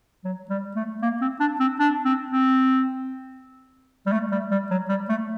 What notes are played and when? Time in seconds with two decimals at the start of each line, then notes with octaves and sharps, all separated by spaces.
0.24 F#3
0.50 G3
0.76 A3
1.02 A#3
1.21 C4
1.40 D4
1.60 C4
1.79 D4
2.05 C4
2.30 C4
4.06 G3
4.12 A3
4.32 G3
4.51 G3
4.71 F#3
4.89 G3
5.09 A3